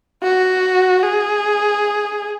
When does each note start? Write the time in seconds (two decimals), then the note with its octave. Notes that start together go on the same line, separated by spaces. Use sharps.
0.23 F#4
1.03 G#4